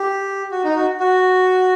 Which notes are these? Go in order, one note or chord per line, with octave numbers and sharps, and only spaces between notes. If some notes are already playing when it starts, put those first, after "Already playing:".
Already playing: G4
F#4
D#4
F#4
F#4